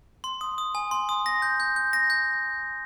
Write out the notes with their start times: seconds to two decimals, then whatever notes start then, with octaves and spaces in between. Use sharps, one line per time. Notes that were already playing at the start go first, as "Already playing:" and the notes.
0.24 C6
0.41 D#6
0.58 D#6
0.75 G#5
0.91 C6
1.09 D#6
1.26 A#6
1.42 G6
1.60 G6
1.76 G6
1.93 A#6
2.10 G6